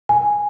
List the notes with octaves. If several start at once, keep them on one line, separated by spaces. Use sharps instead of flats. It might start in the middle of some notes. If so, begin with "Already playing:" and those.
G#5